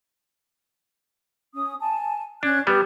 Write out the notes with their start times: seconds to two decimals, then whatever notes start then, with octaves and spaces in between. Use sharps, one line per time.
1.54 C#4 D#6
1.80 G#5 A5
2.43 C#4 D4 F#6 G#6
2.67 G3 B3 G4 B4